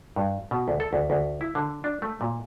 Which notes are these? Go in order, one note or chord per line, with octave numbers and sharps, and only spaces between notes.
G2
B2
D2
A4
D2
D2
E4
D3
D4
A3
A#2